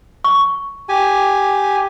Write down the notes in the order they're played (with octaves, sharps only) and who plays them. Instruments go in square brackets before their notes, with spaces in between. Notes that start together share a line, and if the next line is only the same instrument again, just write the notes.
[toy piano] C#6
[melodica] G4 G#5